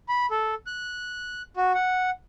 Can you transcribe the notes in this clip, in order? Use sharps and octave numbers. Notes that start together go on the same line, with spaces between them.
B5
A4
F#6
F#4
F#5